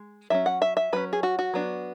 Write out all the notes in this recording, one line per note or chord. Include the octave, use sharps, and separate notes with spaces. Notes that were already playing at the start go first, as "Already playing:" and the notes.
Already playing: G#3
F#3 C#4 E5
F#5
E5
E5
F#3 C#4 B4
G#4
F#4
F#4
F#3 B3 D4